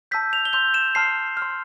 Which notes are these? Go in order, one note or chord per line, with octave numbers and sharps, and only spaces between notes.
A5 E6 G6 B6
F7
G7
C6 E6 G6 F7
E7
A5 C6 F6 C7
F6
C6